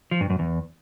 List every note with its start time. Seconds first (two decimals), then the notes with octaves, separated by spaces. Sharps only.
0.11 F3
0.21 G2
0.30 F#2
0.39 E2